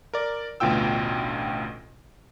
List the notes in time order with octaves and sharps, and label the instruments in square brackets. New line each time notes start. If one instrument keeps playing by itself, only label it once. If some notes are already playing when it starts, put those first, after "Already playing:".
[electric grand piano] A#4 D5
A1 D2 B2 F4 G5 E6